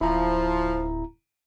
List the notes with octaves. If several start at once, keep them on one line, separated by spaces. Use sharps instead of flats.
D1 F3 E4 A#5